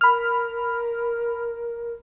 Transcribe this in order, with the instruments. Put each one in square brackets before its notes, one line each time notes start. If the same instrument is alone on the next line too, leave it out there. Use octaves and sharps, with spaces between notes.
[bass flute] A#4 [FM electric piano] B5 F6